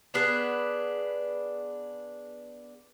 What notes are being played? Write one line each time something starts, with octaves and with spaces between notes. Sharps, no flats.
B3 D4 G#4 B4